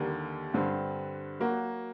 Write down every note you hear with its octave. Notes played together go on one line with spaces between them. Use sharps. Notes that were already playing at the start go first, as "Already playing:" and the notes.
Already playing: D#2 D3 G3 A#3
G2 D3 G3 C4
F#3 A#3 F#4